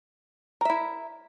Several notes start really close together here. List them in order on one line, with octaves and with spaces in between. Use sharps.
A#4 E5 E4